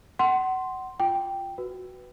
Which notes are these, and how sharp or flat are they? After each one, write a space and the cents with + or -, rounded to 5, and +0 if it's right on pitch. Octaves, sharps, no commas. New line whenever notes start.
F#5 +25 C6 +0
F4 +0 G5 +0
F#4 +0 B4 +0